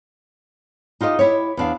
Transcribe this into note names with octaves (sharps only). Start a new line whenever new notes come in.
D#4 F4 G4 C#5 D#5
E4 G4 C#5
E2 D4 F5